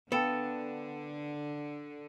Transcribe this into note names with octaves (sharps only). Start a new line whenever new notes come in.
D3 B3 A4 F5 G5 A5